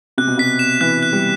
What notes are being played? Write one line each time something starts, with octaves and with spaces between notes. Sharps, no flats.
C3 F#6
B2
C3 B6
E7
E3 F#6
F#6
G3